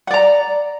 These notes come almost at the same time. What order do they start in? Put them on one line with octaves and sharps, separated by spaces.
F#5 D5 A#5